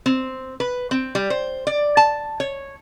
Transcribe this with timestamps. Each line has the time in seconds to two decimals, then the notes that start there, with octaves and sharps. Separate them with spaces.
0.06 C4
0.60 B4
0.91 C4
1.15 G3
1.30 C5
1.67 D5
1.97 A5
2.40 C#5